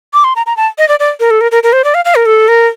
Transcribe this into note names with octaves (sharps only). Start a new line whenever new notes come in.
D6
C6
A#5
A#5
A5
D#5
D5
D5
A#4
A4
A#4
A#4
A#4
C5
D5
F5
F5
A#4
A4
A#4